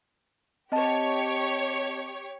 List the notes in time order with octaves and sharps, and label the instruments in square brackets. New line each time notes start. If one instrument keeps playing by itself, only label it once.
[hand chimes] C4 D#5 A5 [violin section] G4 C#5